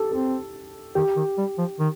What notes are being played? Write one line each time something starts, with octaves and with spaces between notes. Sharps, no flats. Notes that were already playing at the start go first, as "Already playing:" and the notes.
Already playing: G4 A4
C4 A4
D#3 G4
D#3
G3
F3
D#3